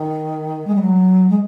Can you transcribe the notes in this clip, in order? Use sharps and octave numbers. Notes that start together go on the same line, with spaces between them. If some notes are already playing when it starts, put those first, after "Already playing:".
Already playing: D#3
G#3
G3
F#3
G#3